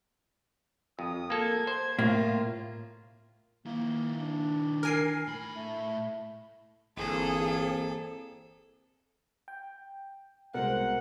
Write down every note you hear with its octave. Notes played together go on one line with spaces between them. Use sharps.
F2 D#6
A#3 A4 G#6
C5
A2 A#3 F4
D#3 A#3 E4
D4
A#4 G#5 C7
A2 B5
A3
G1 E3 A#3 C4 G#4 A4
G5
C2 B2 G#3 A#4 C5 F#5